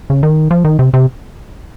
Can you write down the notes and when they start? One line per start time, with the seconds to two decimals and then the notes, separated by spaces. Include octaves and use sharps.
0.10 C#3
0.23 D#3
0.51 F3
0.64 D#3
0.79 C3
0.94 C3